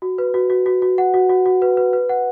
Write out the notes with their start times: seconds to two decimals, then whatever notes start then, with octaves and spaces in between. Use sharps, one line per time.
0.02 F#4
0.18 B4
0.34 F#4
0.50 F#4
0.66 F#4
0.82 F#4
0.98 F#5
1.14 F#4
1.29 F#4
1.46 F#4
1.62 B4
1.77 B4
1.93 B4
2.09 F#5